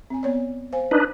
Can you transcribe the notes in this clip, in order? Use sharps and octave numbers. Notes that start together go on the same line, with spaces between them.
C4 G#5
B3 C#5 D5
C5 F5 G#5
D4 D#4 B4